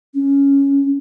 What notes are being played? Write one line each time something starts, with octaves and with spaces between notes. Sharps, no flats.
C#4